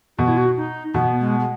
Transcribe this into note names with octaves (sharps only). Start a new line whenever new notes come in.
B2 F#4
E4
F#4
D#4
B2 B3
G#3
G#3